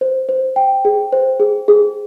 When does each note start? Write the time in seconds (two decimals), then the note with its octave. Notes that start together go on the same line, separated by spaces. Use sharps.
0.01 C5
0.29 C5
0.56 G5
0.85 G#4
1.12 C5
1.40 G#4
1.68 G#4